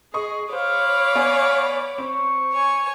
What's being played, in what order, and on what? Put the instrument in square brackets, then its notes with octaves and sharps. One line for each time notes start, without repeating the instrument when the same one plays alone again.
[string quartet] G#4 [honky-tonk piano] D#5 C#6 D#6
[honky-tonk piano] C5 [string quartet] C#5 B5 D6 [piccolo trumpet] F5
[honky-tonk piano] B3 D5 G#5
[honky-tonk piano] C4 [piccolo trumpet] C#6
[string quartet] C#5 G#5